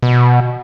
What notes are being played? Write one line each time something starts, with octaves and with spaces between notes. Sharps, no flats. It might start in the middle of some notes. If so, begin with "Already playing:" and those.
B2